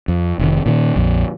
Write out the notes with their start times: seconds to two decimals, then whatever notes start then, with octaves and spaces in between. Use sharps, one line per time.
0.08 F2
0.39 F1 G#2 D#3
0.66 A#2 D#3
0.96 A#1 F2